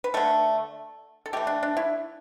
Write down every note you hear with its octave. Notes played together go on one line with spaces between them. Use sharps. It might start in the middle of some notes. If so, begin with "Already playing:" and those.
B4
D3 A3 A4
A4
E3 A3 G4
D4
D4
E4